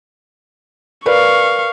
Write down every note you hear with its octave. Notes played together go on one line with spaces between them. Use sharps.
A#4 B4 D5 F5 C#6